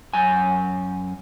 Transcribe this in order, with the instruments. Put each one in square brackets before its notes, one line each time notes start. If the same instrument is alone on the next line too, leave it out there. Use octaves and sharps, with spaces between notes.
[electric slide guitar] F#2 G#5